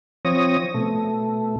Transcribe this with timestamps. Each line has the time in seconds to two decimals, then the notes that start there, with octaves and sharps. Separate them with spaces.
0.25 F3 C4 C#5 D#6 A#6
0.75 B2 A3